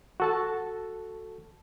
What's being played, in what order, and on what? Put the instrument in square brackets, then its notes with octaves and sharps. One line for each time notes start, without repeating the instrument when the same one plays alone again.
[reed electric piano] F#4 A4 A5